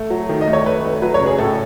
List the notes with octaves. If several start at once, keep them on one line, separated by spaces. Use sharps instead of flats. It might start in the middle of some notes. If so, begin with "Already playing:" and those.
Already playing: A3
F#3
D#3
D#5
A3
C#5
A3 B4
A3
F#3 B4
C#5
C#3
G#4
A2 A4